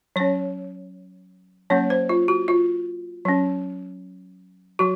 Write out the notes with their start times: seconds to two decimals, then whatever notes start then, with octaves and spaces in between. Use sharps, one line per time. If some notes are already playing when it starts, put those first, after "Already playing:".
0.16 F#3 C#4 C#5
1.70 F#3 A#3 C#4 C#5
1.90 C5
2.09 F4
2.28 F#4
2.48 F4
3.25 F#3 C#4
4.79 F#3 F#4